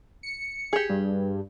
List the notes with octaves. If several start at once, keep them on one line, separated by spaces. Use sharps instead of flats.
C#7
G4 G#4
G2